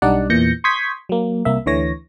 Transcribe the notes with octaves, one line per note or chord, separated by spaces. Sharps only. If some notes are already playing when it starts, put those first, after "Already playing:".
B1 G3 D4 D#4 D5 F#5
E2 A#2 E3 G6 A#6 C#7
C6 C#6 D#6 G6 G#6 B6
F#3 A#3
C2 A#3 E5
D2 D3 E3 C#5 A#6